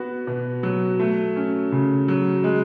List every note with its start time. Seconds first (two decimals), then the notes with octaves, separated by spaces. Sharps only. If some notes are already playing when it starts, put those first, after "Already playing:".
Already playing: B3 F#4
0.27 B2
0.63 F#3
1.00 A3
1.36 C#4
1.72 C#3
2.08 F#3
2.44 G#3